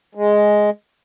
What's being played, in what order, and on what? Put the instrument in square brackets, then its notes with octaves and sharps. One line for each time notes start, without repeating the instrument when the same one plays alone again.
[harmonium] G#3